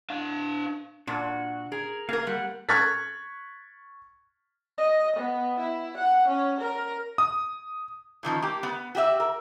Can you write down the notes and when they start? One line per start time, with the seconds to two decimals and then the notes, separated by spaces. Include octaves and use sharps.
0.10 D4 F5
1.07 A#2 D4 F#4
1.72 G#4 A#4
2.09 A#3 G#4 A#4 F5
2.27 G3 F#5
2.69 C#6 F6 F#6 G#6 A6 B6
4.78 D#5
5.16 B3
5.59 E4
5.97 F#5
6.28 C#4
6.60 A#4
7.18 D#6
8.23 A#2 D#3 F3 C#4
8.42 A#3 G4
8.63 B3
8.95 F#4 G4 D5 E5
9.20 A#4